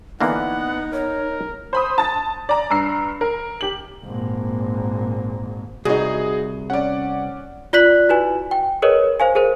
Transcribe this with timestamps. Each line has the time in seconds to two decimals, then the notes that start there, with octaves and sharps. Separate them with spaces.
0.21 D3 E3 A#3 B3 D#4 F#5
0.92 A#4 C#5
1.73 C5 B5 D#6
1.98 A5 A6
2.49 D5 A#5
2.70 G2 A#5 E6 C7
3.21 A#4
3.61 G4 F#7
4.05 G#1 A#2
5.85 C2 D#4 F#4 G#4
6.70 C#4 D5 F#5
7.73 F4 D5 F#6 B6 F#7
8.09 E4 F#4 B4 G#5
8.51 G5
8.82 G#4 A#4 B4 C#5 D#5
9.20 C5 F5 G#5
9.35 G#4 A#4 C5